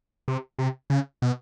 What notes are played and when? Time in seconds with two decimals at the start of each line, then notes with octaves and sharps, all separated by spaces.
0.28 C3
0.59 C3
0.90 C#3
1.22 B2